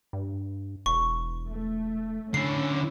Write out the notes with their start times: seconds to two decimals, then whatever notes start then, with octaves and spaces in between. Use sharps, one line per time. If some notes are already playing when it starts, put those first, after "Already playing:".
0.13 G2
0.86 E1 C#6
1.49 A3
2.34 D3 C#4 E4 C7